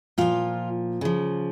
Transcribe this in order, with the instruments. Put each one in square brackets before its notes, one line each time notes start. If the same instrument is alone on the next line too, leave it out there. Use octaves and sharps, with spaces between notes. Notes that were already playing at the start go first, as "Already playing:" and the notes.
[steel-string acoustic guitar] A#2 F3 F4 F5
C#3 F3